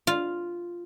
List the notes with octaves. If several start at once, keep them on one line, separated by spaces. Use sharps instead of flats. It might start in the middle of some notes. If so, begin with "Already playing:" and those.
F4